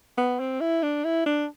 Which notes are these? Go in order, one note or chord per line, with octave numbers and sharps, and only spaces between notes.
B3
C4
E4
D4
E4
D4